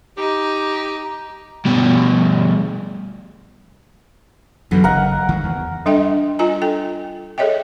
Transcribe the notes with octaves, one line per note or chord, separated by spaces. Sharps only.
D#4 G4
G2 B2
F#2 B2 D3 E3 F#3
F#1 A#4 D#5 F#5
D#3 E3 G#3
E2
G3 D4 A4 D#5 E5 G5
D4 F4 D#5 G#5 A#5
A4 G5
G#4 A4 C#5 D#5 E5 G5